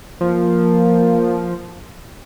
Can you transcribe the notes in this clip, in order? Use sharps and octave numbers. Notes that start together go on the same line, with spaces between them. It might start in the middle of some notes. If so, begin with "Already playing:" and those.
F3 A#3